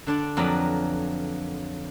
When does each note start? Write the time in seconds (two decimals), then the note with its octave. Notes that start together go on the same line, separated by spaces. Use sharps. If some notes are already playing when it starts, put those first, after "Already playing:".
0.07 D3 D4 D5
0.37 F2 F#3 A#4 B4 D5 B5